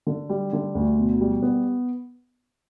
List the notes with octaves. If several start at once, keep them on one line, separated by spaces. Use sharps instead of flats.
D3
G3
D3
D2
B2
G3
B3